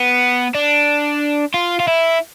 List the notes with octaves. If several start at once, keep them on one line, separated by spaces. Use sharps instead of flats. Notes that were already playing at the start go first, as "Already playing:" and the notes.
Already playing: B3
D4
F4
F4
E4